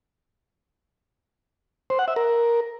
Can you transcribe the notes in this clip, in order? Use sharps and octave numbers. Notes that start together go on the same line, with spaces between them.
C5
F#5
E5
A#4